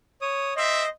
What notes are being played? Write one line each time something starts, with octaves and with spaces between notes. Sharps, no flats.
C#5 D#6
C4 C5 D#5 E5